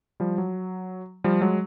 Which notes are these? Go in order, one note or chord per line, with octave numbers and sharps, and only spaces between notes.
F3 G3
F#3
F3 G3
F#3 G#3